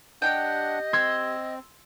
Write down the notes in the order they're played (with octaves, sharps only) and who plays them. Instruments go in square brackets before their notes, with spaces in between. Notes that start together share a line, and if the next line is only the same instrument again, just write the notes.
[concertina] D4 F#5 [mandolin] G4 G5 [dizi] D#5
[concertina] C4 [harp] C6 E6 G#6